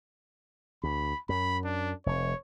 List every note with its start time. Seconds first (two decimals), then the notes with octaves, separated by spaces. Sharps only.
0.83 D2 B5
1.29 F#2 B5
1.64 D4
2.06 F1 C#5